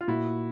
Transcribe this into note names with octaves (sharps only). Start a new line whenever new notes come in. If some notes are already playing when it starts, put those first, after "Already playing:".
F4
A#2 E4 F#4